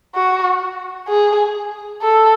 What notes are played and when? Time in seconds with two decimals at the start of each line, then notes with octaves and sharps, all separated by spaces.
0.15 F#4
1.08 G#4
2.02 A4